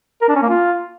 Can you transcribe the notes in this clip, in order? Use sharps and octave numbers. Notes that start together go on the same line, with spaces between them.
A#4
D4
C#4
A#3
F4